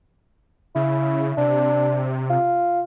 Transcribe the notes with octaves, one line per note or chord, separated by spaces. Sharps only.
C#3 E4
C3 D4
F4